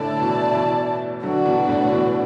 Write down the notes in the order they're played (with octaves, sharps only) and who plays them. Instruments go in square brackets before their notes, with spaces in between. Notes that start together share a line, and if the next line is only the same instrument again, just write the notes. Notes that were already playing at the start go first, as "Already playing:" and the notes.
Already playing: [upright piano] A2 D3 [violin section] E4 D5 A5
[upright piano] B2 E3
B2 E3
[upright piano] D3 F#3 [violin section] D4 F#4 B4 D5
[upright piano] B2 E3
A2 D3
B2 E3